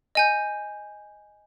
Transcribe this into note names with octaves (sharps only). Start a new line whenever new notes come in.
D#5 G#5 G6